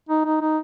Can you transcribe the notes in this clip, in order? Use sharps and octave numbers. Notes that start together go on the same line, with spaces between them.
D#4
D#4
D#4